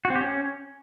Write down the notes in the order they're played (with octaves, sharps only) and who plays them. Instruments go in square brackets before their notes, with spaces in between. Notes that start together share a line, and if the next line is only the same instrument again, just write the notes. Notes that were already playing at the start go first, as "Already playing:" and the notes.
[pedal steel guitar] F#4
C4
G4
C#4